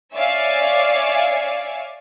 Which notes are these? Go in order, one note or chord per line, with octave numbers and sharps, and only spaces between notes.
C#5 D5 E5 F5 G#5